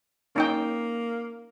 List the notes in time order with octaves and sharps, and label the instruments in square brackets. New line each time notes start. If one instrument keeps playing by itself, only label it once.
[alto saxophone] A#3 [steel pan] C#4 D#4 G5